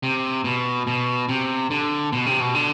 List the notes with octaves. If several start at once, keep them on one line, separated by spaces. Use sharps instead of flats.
C3
B2
B2
C3
D3
B2
C3
B2
D3